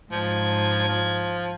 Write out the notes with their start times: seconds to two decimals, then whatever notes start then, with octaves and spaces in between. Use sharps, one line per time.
0.12 G#2 F3 G#6
0.89 F3